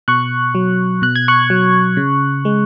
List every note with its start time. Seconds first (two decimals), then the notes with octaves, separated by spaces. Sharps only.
0.08 B2 C#6 F#6
0.55 F#3
1.02 B2 F#6
1.16 G#6
1.28 C#6 F#6
1.50 F#3
1.97 C#3
2.45 G#3